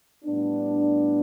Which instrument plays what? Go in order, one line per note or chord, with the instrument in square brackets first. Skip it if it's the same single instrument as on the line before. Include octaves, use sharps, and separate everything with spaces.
[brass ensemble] A2 G3 B3 D4